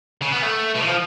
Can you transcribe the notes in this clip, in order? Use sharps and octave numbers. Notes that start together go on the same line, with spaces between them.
C#3
B3
A3
B2
F3